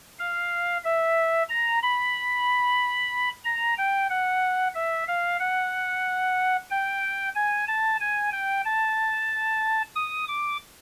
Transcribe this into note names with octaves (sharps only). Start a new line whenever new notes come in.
F5
E5
A#5
B5
A#5
G5
F#5
E5
F5
F#5
G5
G#5
A5
G#5
G5
A5
D#6
D6